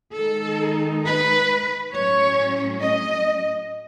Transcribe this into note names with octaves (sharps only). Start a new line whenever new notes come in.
D#3 G#3 D#4 A4
B4
A2 F#3 C#4 C#5
D#5